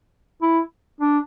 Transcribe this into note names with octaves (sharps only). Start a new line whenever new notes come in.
E4
D4